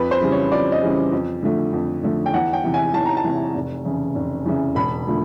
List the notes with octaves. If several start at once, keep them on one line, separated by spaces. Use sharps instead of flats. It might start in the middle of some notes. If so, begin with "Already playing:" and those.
Already playing: F2 B4
C5
C#3 E3 G3
C#5
F2 D5
D#5
C#3 E3 G3
F2
D3 F3 A3
F2
D3 F3 A3
G5
E2 F#5
G5
C3 E3
G#5
E2 A5
A#5
A5
C3 E3
F1
E2 C#3 E3
F1
E2 C#3 E3
E1 B5
D3 F3 A3